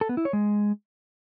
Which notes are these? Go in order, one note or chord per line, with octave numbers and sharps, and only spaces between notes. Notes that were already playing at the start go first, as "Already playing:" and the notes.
A4
B3
E4
C#5
G#3